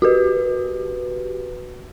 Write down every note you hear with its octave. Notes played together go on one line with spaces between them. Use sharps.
F#4 G4 B4